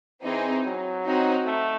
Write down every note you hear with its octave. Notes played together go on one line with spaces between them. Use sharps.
E3 C4 D#4 G#4
F#3
C4 D#4 F#4
A3